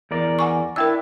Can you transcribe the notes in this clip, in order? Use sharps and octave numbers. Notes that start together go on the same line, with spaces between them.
E2 A#4 D5
F#5 G#5 C#6
D4 E4 A#4 G5 E6